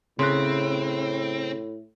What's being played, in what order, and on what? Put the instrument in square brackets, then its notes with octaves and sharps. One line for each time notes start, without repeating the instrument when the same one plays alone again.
[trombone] A2 [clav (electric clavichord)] C#3 [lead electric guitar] C4 [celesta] C6 F#6